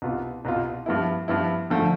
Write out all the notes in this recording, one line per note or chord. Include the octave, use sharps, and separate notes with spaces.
C2 B2 B3 F4
C2 B2 B3 F4
G2 F3 B3 E4
G2 F3 B3 E4
D3 F3 A3